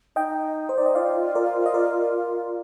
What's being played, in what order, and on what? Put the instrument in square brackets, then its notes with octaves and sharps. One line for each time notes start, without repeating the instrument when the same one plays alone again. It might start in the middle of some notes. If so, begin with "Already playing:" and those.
[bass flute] D#4 [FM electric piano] D#5 G5
[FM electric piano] C5
D5
D#5
[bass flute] F4 [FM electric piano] D5 F5
[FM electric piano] A#4 D5
D#5
A#4 D5